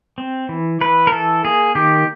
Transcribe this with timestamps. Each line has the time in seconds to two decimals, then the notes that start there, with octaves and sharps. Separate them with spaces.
0.18 C4
0.49 E3
0.81 E3 B4
1.07 A#4
1.12 E3 A4
1.44 A#3 G#4
1.75 D#3 G4